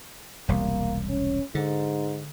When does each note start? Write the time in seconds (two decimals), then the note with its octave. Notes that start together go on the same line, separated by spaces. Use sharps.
0.48 E1 C2 G3 A#3
1.09 C#4
1.55 G#2 D3